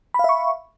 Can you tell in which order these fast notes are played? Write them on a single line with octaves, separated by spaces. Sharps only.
B5 F5 E5 C#6